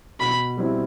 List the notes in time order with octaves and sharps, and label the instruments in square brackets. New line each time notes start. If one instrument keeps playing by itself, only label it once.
[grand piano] B2 [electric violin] B5
[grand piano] G3 C4 E4